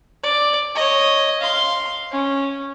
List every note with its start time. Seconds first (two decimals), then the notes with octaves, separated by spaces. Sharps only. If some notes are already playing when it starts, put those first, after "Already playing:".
0.23 D5
0.75 C#5 D#5
1.41 F5 C6
2.11 C#4